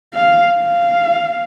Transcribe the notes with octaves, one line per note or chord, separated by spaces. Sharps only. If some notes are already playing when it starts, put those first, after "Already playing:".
F5
F5